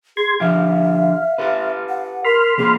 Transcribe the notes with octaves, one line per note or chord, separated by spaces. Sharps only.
G#4 C6 G#6
D3 F3 G4 E5 F5
G4 A4 B4
F#5
A#4 B5 C6 F6
C#3 A#3 C4 G#4